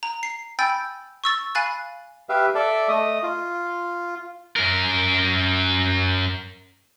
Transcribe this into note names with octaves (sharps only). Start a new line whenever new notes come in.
A#5
C7
G5 G#5 B5 E6 G6 A6
C#6 E6 A6
F5 G#5 B5 F#6 A6
G4 B4 E5 F5
A4 D5 E5
A3 D#5
F4
F#2 A#4